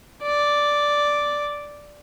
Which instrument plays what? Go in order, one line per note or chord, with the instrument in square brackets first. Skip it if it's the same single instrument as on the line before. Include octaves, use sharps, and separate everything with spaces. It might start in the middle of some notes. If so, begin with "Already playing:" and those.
[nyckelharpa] D5